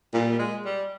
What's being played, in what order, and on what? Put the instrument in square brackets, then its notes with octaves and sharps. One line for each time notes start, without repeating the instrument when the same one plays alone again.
[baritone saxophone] A#2 [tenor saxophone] G3
[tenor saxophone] G3
G#3
G3